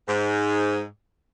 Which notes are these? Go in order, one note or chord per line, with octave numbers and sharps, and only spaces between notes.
G#2